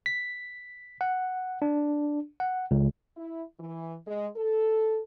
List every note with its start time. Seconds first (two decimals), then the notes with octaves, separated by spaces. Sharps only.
0.06 B6
1.01 F#5
1.62 D4
2.40 F#5
2.71 C#2
3.17 E4
3.60 E3
4.07 G#3
4.37 A4